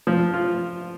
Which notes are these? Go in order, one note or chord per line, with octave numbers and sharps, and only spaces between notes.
F3
F4